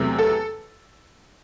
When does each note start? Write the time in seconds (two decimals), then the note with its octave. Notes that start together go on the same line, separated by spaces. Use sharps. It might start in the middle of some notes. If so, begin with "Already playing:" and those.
Already playing: E2 C3 F#3 A3
0.19 A4